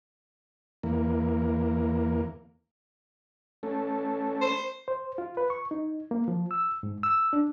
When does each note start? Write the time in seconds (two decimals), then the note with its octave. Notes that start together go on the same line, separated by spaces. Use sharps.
0.83 E2 A#3
3.63 A3 C#4 A4
4.41 C5
4.88 C5
5.18 F4
5.37 B4
5.50 C#6
5.71 D#4
6.11 A#3
6.28 F3
6.51 E6
6.83 G#2
7.03 E6
7.33 D4